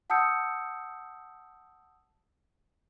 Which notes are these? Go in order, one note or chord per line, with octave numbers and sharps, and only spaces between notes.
F#5 A5 D#6 E6 G6 C#7